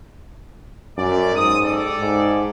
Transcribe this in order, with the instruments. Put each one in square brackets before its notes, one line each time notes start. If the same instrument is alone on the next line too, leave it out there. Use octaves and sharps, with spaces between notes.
[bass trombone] F#2 [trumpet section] A3 D5
[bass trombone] G#2 [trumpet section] C4 D#6
[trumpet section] G4 A4 D5
[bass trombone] G#2